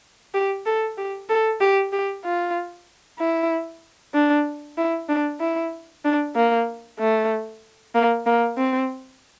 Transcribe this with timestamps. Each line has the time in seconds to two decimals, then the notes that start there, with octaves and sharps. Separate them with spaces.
0.34 G4
0.66 A4
0.98 G4
1.30 A4
1.61 G4
1.93 G4
2.25 F4
3.19 E4
4.14 D4
4.78 E4
5.09 D4
5.40 E4
6.05 D4
6.36 A#3
6.99 A3
7.95 A#3
8.26 A#3
8.58 C4